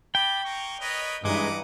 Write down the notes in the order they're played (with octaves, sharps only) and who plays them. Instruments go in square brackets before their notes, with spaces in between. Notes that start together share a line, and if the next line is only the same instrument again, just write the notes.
[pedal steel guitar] G5 [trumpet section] A5 B5 D6
[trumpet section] A#3 A#5 C#6
[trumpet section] A#4 B4 C#5 [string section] D#5
[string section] G2 E3 D#4 [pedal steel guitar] G#3 [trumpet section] F#5 D6 D#6